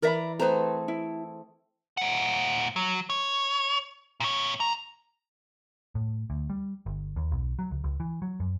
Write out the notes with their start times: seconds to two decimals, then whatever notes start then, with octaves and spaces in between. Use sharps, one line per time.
0.02 E3 A#4 D5 E5 A#5 B5
0.40 A3 C4 G#4 B4 C5 A#5
0.88 E4
1.97 A#2 F#5
2.76 F#3
3.10 C#5
4.20 A#2 C#5
4.60 E2 A#5
5.95 A2
6.30 D2
6.50 G3
6.86 G1
7.16 D#2
7.32 B1
7.59 F#3
7.71 C#2
7.84 C#2
8.00 E3
8.22 F#3
8.40 F#2